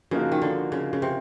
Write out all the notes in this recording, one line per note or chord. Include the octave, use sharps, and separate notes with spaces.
C#3 F3 A#3 D#4 F#4
D#3
D3
C#3
C#3
C3